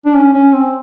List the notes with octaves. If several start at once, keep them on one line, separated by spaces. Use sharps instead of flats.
D4
C#4
C#4
C4